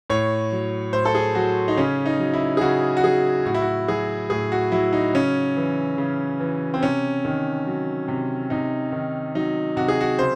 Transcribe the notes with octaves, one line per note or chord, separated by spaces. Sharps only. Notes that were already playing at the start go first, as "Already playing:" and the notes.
A2 C#5
F#3
A2 C5
A4
G#4
F#3 F#4
D#4
C#3 C#4
D#4
F#3
E4
G#4
C#3 F#4
F#4
F#3 G#4
A2 F#4
E4
F#4
F#3 G#4
A2 G#4
F#4
F#3 E4
D#4
C#3 C#4
E3
C#3
E3
C4
C3 C#4
D#3
F#3
C3
C3 D#4
D#3
F#3 D#4
C3 F#4
G#4
F#4
C#3 C5